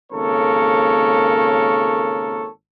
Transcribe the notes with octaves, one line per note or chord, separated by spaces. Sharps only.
G#1 C#3 A#3 A4 A#4 C#5